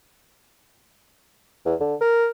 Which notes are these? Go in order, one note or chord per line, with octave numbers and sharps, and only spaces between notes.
E2
D3
A#4